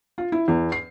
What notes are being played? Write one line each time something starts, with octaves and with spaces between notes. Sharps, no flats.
F4
E4
E2
C7